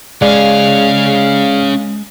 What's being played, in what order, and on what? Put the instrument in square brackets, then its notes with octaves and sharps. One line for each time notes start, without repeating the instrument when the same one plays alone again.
[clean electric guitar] G#3 [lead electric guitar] C#4 G#4 [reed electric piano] D5 [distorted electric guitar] F5